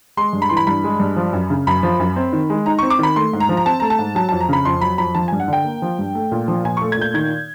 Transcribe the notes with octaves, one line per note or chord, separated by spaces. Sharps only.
G#3 C6
G2
B5
E3 C6
B5
G2 B5
G#3
G2
F3
F#2
C#3
F#2 B5
F3
F#2
C4
D#3
G#3
D#4 A#5
C4 C#6
D6
D#3 B5
A3 C6
G#2
A#5
F3
A#5
C4 A5
A3 A#5
A5
G#2
F#3 A5
F2 A5
A#5
C#3 B5
F2 C6
F#3 B5
F2 B5
F3 A5
G2 G#5
F#5
D3 G5
A#3
F3
G2
A3
A#2
F3
A#2 G#5
A3 C#6
G#6
A#2 G6
D#3 G#6